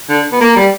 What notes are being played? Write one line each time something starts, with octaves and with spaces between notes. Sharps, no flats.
D3
B3
A#3
G3